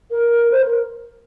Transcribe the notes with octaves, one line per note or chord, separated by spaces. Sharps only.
A#4
C5
A#4